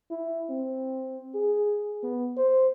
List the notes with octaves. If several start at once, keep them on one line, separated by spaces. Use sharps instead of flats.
E4
C4
G#4
B3
C5